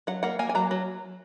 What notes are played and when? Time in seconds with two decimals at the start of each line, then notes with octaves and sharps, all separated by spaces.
0.07 F#3 F#5
0.23 A#3 F#5
0.39 A#3 G#5
0.49 G#5
0.55 F#3 A#5
0.71 F#3